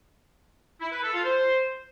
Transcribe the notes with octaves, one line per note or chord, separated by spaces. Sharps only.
E4
B4
A4
F4
C5